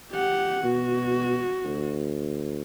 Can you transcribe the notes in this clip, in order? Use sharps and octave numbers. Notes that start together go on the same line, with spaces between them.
G4 F#5
B2 F#4
D2